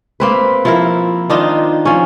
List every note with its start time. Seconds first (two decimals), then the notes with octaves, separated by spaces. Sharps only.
0.20 A#3 C4 B4
0.65 F3 E4 A#4
1.30 D#3 D4 D#4 F4
1.85 F3 C#4